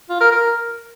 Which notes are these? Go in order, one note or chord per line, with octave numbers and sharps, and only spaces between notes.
F4
A#4
A#4